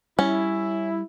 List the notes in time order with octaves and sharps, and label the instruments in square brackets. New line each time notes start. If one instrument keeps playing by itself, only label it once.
[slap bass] G3 [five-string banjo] C#4 [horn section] E4